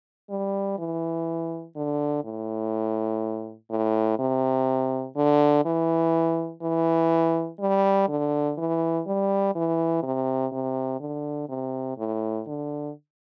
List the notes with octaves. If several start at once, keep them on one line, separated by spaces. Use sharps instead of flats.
G3
E3
D3
A2
A2
C3
D3
E3
E3
G3
D3
E3
G3
E3
C3
C3
D3
C3
A2
D3